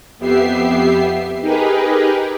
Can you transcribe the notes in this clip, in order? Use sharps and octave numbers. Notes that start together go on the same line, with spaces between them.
F2 B3 G4 E5 C7
D#4 G4 G#4 A#4 B4